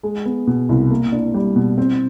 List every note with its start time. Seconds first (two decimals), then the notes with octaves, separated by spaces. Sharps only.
0.03 G#3
0.26 B3
0.47 B2
0.69 C2
0.91 A#3
1.12 D4
1.34 G3
1.56 B2
1.78 C4